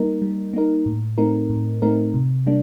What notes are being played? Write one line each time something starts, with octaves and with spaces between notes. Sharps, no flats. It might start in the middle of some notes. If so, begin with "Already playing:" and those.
Already playing: G3 A#3 D#4 A#4
G3
A#3 D#4 A#4
A2
A3 C4 D#4 A#4
A2
A3 C4 D#4 A#4
C3
G3 A#3 D4